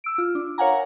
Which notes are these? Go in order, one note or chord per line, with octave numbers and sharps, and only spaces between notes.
E6 D7
F4
D4
A#4 C#5 F5 F#5 G#5 A#5